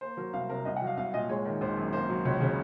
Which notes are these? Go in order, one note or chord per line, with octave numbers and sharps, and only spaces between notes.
A#3 C5
F#3 A#4
C2 F5
C3 A#4
C2 D#5
F#5
F#3
F5
C2 F5
A#2 D#5
G#3 C#5
D#3
G#1 C5
F#2
A#3 C5
F#3
C#2 C#5
C#3 C#5